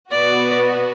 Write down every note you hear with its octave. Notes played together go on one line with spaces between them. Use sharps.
B2 B3 F#4 B4 D5